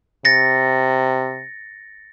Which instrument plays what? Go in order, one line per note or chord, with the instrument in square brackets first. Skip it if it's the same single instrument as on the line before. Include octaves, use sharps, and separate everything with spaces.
[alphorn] C3 [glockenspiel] A6 A#6 C#7